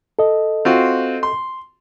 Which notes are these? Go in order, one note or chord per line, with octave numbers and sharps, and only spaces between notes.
A4 D#5
C4 F4 F#4
C6